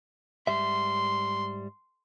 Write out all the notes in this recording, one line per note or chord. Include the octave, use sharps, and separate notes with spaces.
G#2 G3 E5 C6